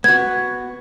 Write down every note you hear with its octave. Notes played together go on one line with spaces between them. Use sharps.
B3 F#4 G#6